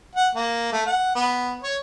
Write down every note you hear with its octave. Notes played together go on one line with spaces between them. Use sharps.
F#5
A#3
A3
F#5
B3
C#5